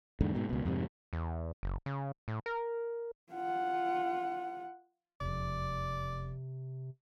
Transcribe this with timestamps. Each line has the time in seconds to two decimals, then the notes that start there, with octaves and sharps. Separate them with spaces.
0.21 E2 G#2 D3
0.35 G#2 B2
0.49 C#2 B2
0.65 F2 G#2 C3
1.13 E2
1.63 F#1
1.86 C#3
2.28 A2
2.46 A#4
3.33 F4 F#5
5.21 E1 F2 C3 D5